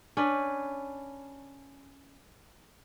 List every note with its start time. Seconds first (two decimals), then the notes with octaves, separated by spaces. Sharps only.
0.17 C#4 D4 B4